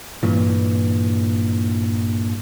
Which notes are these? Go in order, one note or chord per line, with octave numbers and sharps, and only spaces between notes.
G2 A#2 E3